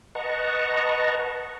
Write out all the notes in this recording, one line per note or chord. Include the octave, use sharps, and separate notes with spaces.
B4 D#5 F#5 A5 A#5 C#6